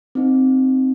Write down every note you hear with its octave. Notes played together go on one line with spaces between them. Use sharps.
C4 D#4